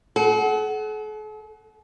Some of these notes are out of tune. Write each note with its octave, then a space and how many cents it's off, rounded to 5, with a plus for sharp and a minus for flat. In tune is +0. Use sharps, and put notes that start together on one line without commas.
A4 -45 F#5 +20